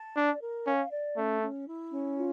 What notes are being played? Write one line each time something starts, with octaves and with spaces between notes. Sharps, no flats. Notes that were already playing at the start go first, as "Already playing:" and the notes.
Already playing: A5
D4 D5
A#4
C#4 F5
D5
A3 C#4
C#4
E4
C#4
F4